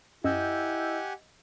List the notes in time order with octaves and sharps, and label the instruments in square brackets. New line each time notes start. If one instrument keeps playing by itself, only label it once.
[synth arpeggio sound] F#2 [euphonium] E4 [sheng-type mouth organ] G4 F#5 G#5 [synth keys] D#5 E6 G6